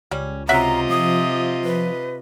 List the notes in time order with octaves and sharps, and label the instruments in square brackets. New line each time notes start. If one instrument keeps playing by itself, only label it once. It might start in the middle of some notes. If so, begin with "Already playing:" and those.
[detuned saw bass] C#2 [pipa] G3 C#4
[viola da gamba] C3 F4 D#5 [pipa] F#3 E5 F#5 [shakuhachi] A#5
[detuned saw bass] F3 [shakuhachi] D#6
[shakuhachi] B4